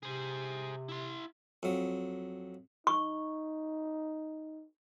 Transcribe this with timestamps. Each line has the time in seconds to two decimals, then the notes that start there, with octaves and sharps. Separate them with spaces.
0.03 C3 G#4 C5
0.89 E4 C6
1.63 F2 F#3
2.87 D#4 C#6